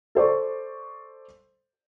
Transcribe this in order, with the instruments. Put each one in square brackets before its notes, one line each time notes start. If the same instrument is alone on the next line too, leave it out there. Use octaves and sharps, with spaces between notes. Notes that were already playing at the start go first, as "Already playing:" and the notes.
[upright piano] A4 C5 D5 C#6